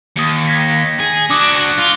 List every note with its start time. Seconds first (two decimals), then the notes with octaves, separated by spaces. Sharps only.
0.16 D#2 D#6 C#7
0.48 G#6 A#6 B6
1.00 G#4
1.30 D4 F#4 D6 D#6 C#7
1.51 F#6
1.78 F4